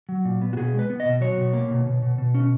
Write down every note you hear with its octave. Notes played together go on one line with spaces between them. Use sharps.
F#3
A#2
B3
F#4
B2 G#4
G#3
B4
B3
D#5
B2
F#3 C#5
B2
A#3
B2
B2
B2
B2
C#4